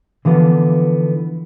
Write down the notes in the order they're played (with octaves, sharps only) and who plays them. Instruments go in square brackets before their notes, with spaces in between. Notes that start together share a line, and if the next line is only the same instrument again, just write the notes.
[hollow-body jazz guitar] D3 E3 F3 B3